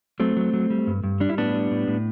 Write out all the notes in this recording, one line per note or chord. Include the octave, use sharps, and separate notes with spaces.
F#3 A3 C4
F#3
F#3
G3
G2
G2
G3 D4
E4
A2 B3 D4
G3
A2
A2